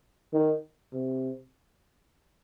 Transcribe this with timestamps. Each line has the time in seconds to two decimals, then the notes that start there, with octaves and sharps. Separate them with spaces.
0.33 D#3
0.93 C3